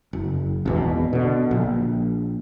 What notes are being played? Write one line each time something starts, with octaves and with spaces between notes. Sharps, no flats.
F#1
G#1 E2 B2
B2 D3
A#1